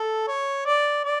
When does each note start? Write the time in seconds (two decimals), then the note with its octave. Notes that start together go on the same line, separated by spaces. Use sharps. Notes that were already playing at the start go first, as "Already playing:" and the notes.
Already playing: A4
0.27 C#5
0.66 D5
1.04 D5